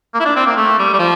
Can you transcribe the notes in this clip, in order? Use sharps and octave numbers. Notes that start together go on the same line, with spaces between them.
A#3
E4
D4
C4
A#3
A3
G3
G3
F3